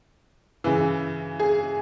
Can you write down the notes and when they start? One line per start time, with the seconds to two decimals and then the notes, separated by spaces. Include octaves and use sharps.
0.64 C#3 E3
1.39 G#4